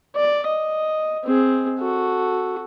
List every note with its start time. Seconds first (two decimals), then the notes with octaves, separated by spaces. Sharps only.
0.16 D5
0.48 D#5
1.25 C4 G#4
1.79 F#4 A4